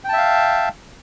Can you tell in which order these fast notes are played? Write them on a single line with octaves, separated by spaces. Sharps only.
G5 A5 E5 F5